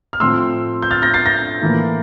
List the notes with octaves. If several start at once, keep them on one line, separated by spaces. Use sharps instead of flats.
F6
A2 F3 C4 C6 E6
G6
F6 A6
G6 A#6
A6 C7
G6 A#6
A2 E3 A#3